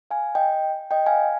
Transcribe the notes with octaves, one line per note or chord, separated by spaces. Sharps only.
F5 G#5
D#5 G5
D#5 G5
F5 G#5